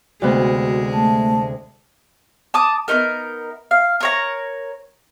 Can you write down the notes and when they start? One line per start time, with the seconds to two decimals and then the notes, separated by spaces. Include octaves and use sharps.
0.22 D2 C3 G#3 B3 F#4
0.93 A3 A5
2.54 A5 D6 D#6
2.88 B3 C#4 D#4 A#4
3.71 F5
4.00 A#4 C#5 A#5